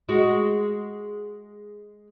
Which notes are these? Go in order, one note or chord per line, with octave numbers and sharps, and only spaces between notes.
G#3 F#4